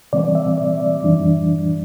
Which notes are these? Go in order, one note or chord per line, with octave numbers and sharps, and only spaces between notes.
C3 E3 G3 C4 D5
E5
D5
D5
F#2 E3 G3 D4